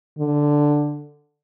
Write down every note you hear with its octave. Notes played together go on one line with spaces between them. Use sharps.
D3